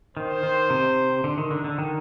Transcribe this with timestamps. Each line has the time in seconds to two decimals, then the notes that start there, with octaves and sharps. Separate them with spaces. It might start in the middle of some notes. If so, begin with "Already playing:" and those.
0.17 D#3 C5
0.43 D#3
0.70 C3
1.24 D3
1.38 D#3
1.51 D3
1.64 D3
1.78 D#3